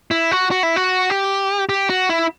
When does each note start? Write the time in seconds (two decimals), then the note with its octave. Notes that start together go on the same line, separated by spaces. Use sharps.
0.11 E4
0.31 F#4
0.51 F#4
0.63 E4
0.76 F#4
1.10 G4
1.69 G4
1.90 F#4
2.10 E4